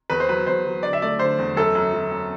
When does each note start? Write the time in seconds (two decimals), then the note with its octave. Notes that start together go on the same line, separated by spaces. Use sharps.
0.10 E2 B4
0.20 C5
0.29 F#3 B4
0.47 E2 C5
0.65 F#3
0.83 D3 D5
0.93 E5
1.02 A3 D5
1.19 D3 C5
1.39 E2
1.56 F#2 A4
1.75 F#2
1.93 F#2
2.11 F#2